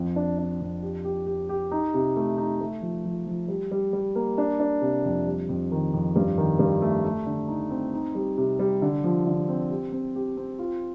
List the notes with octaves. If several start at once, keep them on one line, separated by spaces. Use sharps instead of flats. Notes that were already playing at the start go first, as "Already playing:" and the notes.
Already playing: F2
D4
D4
F2
G4
G4
G4
G4
D#4
C3
A3
D#4
A3
F3
F3
F3
G3
G3
G3
A#3
D4
D4
C3
F2
G3
F2
D#3
F2
G2
D#3
G2
A3
A3
D3
D#4
C4
D#4
G3
C3
G3
D3
F3
D3
C4
G4
C4
G4
C4
F4